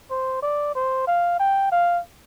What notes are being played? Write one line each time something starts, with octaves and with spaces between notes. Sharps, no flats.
C5
D5
C5
F5
G5
F5